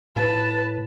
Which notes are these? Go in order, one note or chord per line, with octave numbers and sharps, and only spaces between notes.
A2 B4 A5